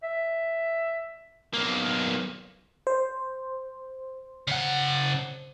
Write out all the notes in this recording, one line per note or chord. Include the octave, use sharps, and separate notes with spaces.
E5
B1 A#3
C5
C#3 F#5